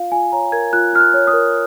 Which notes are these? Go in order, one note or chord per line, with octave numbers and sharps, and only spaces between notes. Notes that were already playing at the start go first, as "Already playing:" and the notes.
Already playing: F4 F5
F4 G#5
C#5 A#5
A#4 G#6
F4 F#6
F4 F6
F#6
C#5
D#6
A#4